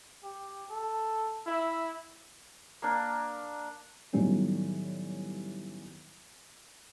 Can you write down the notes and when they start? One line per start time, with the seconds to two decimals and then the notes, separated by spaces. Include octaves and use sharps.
0.23 G4
0.70 A4
1.47 E4 E5
2.82 A#3 D4
4.13 A2 D#3 F#3 G3 B3 C#4